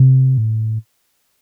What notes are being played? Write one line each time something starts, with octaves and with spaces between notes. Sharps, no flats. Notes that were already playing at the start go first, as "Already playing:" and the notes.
Already playing: C3
A2